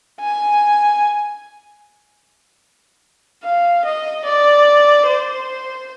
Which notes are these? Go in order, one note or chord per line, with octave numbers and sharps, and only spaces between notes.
G#5
F5
D#5
D5
C5